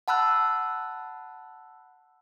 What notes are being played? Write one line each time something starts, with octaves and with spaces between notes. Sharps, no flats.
F#5 A5 B5 E6 F#6